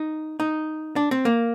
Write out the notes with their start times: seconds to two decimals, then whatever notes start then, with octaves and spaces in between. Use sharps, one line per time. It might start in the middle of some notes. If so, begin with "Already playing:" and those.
Already playing: D#4
0.40 D#4
0.96 D4
1.11 C4
1.25 A#3